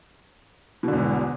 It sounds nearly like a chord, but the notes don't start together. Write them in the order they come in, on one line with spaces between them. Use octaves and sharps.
B2 D3 E2 G#2